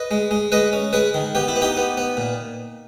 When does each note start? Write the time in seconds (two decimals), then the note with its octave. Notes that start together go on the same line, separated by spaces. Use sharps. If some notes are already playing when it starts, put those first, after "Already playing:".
Already playing: B4 D#5
0.11 G#3
0.31 G#3
0.52 G#3 B4 D#5
0.73 C#4
0.93 G#3 G#4 B4
1.14 D#3
1.35 B3 G4
1.48 E4
1.56 B3
1.62 D#4 G4
1.77 B3
1.97 B3
2.17 A#2